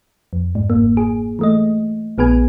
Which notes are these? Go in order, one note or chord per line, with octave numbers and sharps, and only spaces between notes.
F2
G#2
G1 A#3
G#4
E3 A3 D#5
A#1 B3 G#4 B4 G#5